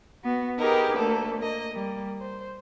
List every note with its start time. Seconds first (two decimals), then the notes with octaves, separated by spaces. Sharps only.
0.23 B3 F#4
0.60 D#4 G4 G#4 A#4 B4
0.99 D2 A3 A#3 A4
1.39 A#3 D#5
1.72 G3 A#3
2.20 C5